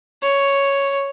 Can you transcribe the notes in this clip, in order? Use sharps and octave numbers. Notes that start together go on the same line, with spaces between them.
C#5